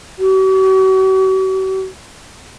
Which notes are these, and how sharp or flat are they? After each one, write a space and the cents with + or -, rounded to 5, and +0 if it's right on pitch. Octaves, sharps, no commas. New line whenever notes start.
F#4 +45